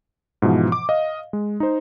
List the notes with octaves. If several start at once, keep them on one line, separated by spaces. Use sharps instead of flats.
G#2 B2 E3 F3
D6
D#5 F5
G#3
D#4 C5